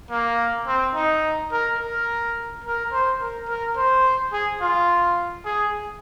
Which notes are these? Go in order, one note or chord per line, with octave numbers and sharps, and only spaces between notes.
A#3
C4
D#4
A#4
A#4
A#4
C5
A#4
A#4
C5
G#4
F4
G#4